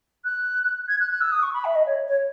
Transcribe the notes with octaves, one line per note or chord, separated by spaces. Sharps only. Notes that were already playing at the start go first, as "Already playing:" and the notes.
F#6
G#6
F#6
F#6
E6
D#6
C#6
B5
E5
D#5
C#5
C#5